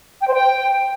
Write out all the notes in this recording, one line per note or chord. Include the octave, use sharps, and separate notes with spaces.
G5
C5
G5